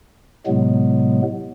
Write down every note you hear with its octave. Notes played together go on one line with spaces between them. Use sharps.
A2 C3 F#3 G#3 B3